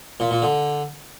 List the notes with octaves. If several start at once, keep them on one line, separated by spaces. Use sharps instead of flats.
A#2
A#2
D3